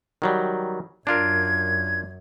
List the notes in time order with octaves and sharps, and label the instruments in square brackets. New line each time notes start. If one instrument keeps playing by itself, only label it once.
[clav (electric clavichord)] D#3 F#3 G3
[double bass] F#2 [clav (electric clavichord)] D4 F4 A#4 [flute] G#6